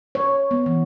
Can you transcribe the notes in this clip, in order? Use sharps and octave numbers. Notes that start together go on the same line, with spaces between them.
C#5
B3
E3